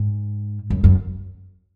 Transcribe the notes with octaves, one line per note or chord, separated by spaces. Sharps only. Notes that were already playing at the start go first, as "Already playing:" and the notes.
Already playing: G#2
F#2
F#2